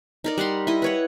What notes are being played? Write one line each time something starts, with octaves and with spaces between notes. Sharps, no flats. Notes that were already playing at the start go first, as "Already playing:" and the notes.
D#4 A#4 D5
G3 F#5 A#5 C6
E4 D#5
B4 C#5 F#5